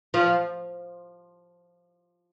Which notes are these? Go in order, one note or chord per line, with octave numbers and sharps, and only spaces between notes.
F3